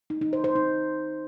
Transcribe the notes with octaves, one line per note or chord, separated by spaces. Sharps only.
D#4
D#4
C5
C5
D#4